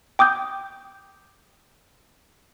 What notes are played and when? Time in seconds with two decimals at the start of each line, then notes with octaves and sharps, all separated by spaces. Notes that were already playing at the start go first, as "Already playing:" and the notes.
0.19 G5 D6 D#6 G6